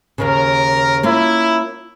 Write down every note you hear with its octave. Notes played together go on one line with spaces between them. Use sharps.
D#2 A#2 C#3 A#4
A#3 C#4 E4 F4